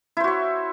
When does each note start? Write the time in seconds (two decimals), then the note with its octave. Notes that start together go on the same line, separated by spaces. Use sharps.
0.17 E4
0.20 C5
0.24 F#4
0.28 C#5